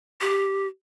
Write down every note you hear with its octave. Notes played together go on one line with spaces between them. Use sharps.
G4